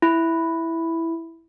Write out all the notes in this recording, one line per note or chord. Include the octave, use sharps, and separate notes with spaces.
E4